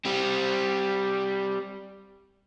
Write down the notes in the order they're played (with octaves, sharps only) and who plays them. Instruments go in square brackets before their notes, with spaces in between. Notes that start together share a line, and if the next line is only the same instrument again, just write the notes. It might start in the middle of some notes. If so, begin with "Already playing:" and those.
[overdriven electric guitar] G3 C4